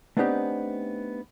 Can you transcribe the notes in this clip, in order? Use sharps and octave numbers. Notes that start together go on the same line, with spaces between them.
A3 B3 C4 D4 D#4 G4